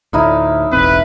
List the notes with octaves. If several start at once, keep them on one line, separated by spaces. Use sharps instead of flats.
D2 A2 D#4 E4 F5
E1 A1 C4 B4